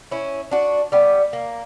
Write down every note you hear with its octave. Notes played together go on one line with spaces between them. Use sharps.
C#4 E4
D4 F#4
G3 B3
A#3